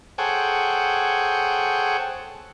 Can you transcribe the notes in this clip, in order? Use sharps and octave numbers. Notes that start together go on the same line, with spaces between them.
G#4 A4 C5 C#5 F#5 G5